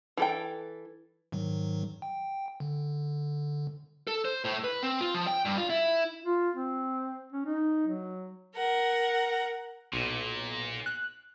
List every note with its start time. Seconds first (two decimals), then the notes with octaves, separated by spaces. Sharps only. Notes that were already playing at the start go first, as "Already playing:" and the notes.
0.17 E3 A4 G5
1.32 G#2 D#3 F#3
2.02 G5
2.60 D3
4.07 A4
4.25 C5
4.45 A2
4.64 B4
4.83 C4
5.01 F4
5.14 F3
5.27 G5
5.45 G2
5.58 F4
5.70 E4
6.24 F4
6.55 C4
7.32 C#4
7.46 D#4
7.87 F#3
8.54 A#4 F#5
9.93 B1 A#2
10.86 F#6